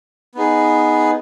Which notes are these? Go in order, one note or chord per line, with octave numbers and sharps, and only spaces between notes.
B3 D#4 G#4